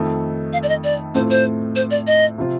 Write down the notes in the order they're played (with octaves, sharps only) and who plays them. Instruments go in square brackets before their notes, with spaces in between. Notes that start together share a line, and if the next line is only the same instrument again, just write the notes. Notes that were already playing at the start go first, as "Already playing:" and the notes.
Already playing: [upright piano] F2 D#3 A3
[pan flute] F5
D5
D#5
D5
[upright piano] A2 A3 C4 F4 [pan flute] C5
[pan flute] C5
C5
D5
D#5
[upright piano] C3 F3 C4 F4